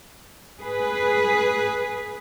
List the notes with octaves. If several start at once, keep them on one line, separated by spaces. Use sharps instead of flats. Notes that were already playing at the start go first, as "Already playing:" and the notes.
G#4 B4